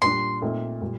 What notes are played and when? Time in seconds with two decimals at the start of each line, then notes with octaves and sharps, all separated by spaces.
0.02 A#2 G3 D4 C6
0.42 A#2 A3 C4 D#4
0.82 A#2 G3